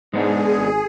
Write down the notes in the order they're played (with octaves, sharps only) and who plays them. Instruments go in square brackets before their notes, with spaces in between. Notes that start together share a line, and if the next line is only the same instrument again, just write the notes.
[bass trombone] G#2 [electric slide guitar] G#3 B3 D4 [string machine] G#4
[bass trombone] G#1